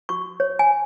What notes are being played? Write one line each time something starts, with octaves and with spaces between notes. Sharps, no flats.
F#4 C#6
C#5
G#5